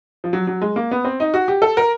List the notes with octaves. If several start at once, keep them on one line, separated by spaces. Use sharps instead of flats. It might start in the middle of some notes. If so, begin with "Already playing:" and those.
F3
F#3
F#3
G#3
A#3
B3
C4
D#4
F#4
G4
A4
A#4